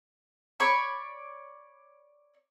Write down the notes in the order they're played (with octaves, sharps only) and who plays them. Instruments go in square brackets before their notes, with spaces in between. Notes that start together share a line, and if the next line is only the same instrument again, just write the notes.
[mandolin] C#5 D5 B5 C#6